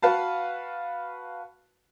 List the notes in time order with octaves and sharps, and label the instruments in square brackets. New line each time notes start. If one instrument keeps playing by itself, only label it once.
[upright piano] F#4 B4 F5 A5